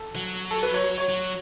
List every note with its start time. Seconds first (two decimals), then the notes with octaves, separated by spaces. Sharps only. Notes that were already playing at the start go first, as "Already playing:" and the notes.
Already playing: A4
0.16 F#3
0.51 A4
0.63 B4
0.74 C#5
0.98 C#5
1.09 F#3